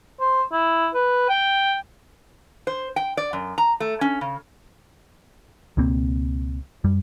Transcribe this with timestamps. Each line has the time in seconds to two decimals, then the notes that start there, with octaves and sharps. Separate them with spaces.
0.20 C5
0.52 E4
0.94 B4
1.29 G5
2.67 C5
2.96 G5
3.17 D5
3.33 F#2
3.58 A#5
3.80 A3
4.01 C#4
4.21 C#3
5.77 C#2 B2 A#3 C4
6.84 F#2 G3